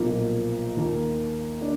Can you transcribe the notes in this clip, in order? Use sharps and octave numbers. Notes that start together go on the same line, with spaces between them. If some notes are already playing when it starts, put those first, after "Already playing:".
Already playing: B1 A#2 F3 A#3
D#2 D#3 A#3
D4